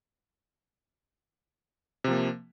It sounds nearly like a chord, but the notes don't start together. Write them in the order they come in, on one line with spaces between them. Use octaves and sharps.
C3 F3 A#3